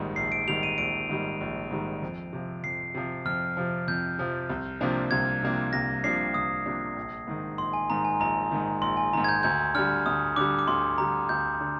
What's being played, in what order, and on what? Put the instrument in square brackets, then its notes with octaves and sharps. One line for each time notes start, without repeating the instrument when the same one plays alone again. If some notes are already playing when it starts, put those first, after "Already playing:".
Already playing: [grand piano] A#1 G#2 D#3 G3
[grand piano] A#1 [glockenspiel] C7
[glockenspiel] D7
[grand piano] G#2 D#3 G3 [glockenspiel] F7
[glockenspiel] D#7
[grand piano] A#1 [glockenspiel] D7
[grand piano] G#2 D#3 G3
A#1
G#2 D#3 G3
F2
C3 F3
[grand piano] F2 [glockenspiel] C7
[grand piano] C3 F3
[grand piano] F2 [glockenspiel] F6
[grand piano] C3 F3
[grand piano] F2 [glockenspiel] G6
[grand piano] C3 F3
C2
C3 F3 A#3 D4
[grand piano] C2 [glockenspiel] G#6
[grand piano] C3 F3 A#3 D4
[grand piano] C2 [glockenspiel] A#6
[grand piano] C3 F3 A#3 D4 [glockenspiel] C7
[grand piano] C2 [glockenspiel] D#6
[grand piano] C3 F3 A#3 D4
A#1
G#2 D#3
[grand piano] A#1 [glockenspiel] C6
[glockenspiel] G#5
[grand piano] G#2 D#3 [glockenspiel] A#5
[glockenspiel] G#5
[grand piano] A#1 [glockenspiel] A#5
[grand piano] G#2 D#3
[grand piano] A#1 [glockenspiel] C6
[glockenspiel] G#5
[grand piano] G#2 D#3 [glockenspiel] A#5
[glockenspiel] G#6
G6
[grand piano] D2 [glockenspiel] G6
[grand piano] D3 G3 [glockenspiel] F6
[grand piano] D2 [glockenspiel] D#6
[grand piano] D3 G3 [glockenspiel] D6
[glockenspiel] D6
[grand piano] D2 [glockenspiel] C6
[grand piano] D3 G3 [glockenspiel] A#5
[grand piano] D2 [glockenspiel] G6
[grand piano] D3